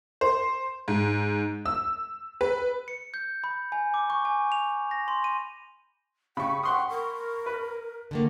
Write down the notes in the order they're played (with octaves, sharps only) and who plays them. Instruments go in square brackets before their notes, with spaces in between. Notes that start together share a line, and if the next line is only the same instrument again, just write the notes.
[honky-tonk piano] C5
G#2
E6
B4
[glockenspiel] C#7
G6
B5
G#5
D6
C#6
G#5
F7
A#6
C6
D#7
[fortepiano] C#3 [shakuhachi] G5 [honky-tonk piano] B5 C#6
[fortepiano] F#5 C6 D#6 [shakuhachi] G5
[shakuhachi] A#4
[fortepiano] B4
[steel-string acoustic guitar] D3 D#3 A#3